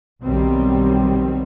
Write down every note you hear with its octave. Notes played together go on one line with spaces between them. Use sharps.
B1 B2 D#3 F#3 G3 C4